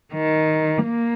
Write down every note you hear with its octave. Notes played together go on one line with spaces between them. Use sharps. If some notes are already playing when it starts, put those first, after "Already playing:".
D#3
A#3